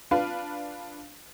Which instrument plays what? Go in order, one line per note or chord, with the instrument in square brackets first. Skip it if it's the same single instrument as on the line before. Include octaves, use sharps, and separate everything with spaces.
[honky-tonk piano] D4 F4 B4 F5